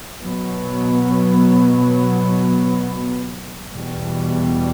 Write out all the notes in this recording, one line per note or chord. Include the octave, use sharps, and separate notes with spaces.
B2 F#3 B3
E2 B2 G3